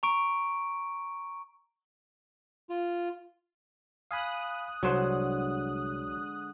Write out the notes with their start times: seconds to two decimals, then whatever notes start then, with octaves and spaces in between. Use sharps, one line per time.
0.03 A#5 C#6 D7
2.70 F4
4.11 F5 G#5 B5 D#6 F#6
4.83 C2 D3 F#3 G#3 C5